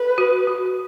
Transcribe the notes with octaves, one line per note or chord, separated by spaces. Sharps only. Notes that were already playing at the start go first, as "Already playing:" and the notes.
Already playing: A4 B4
F#4
F#4